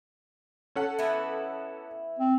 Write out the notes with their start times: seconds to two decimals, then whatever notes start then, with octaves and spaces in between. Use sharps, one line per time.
0.75 C#4 A4 F#5
0.99 E3 B3 E4
2.19 C4